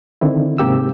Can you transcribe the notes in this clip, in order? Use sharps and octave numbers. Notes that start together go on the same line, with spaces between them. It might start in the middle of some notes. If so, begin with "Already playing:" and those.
D3 D#3 C4 E4
G#2 C3 A#3 G4 E6